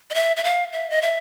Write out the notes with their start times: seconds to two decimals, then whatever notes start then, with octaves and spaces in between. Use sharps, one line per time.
0.10 D#5
0.14 E5
0.36 E5
0.44 F5
0.73 E5
0.90 D#5
1.02 E5